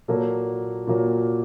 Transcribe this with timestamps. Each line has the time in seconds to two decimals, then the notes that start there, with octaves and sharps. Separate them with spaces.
0.08 A#2 F#3 A#3 A4
0.87 A#2 F#3 A#3